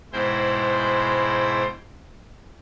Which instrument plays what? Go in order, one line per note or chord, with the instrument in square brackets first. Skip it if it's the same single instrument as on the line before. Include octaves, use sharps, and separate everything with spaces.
[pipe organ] G#2 B2 G#3 E4 C5 G5